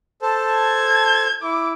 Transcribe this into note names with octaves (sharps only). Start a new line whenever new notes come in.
A4 C5 A5
G#6
E4 D6